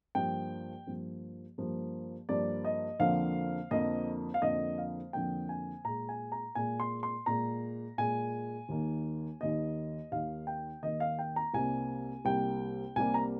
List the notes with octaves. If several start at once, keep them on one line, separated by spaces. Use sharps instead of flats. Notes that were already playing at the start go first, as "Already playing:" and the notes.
G2 F3 A#3 G5
G2 F3 A#3
G2 F3 A#3
G2 F3 A#3 D5
D#5
F2 D3 F3 A#3 F5
F2 D3 F3 A#3 D#5
F5
F2 D3 F3 A#3 D#5
F5
F2 D3 F3 A#3 G5
G#5
A#2 G#3 A#5
G#5
A#5
A#2 G#3 G#5
C6
C6
A#2 G#3 A#5
A#2 G#3 G#5
D#2 D#3 A#3
D#2 D#3 A#3 D#5
D#2 D#3 A#3 F5
G5
D#2 D#3 A#3 D#5
F5
G5
A#5
C2 C3 G3 A#3 G#5
C2 C3 G3 A#3 G5
C2 C3 G3 A#3 G#5
A#5